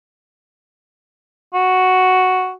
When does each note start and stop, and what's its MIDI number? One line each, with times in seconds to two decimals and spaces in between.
1.54 2.52 66